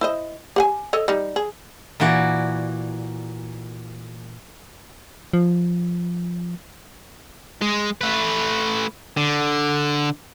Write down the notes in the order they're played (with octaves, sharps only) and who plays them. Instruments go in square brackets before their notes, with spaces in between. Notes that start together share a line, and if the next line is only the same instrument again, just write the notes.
[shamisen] E4 C5 D#5
G4 F#5 G#5
A4 C#5 D#5
G3 D#4
G#4
[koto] A#2 E3 F#4 D5
[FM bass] F3
[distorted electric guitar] G#3
A3 B4
D3